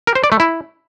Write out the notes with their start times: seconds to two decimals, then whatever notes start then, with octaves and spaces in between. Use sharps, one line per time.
0.07 A#4
0.15 C5
0.24 D5
0.32 A3
0.40 E4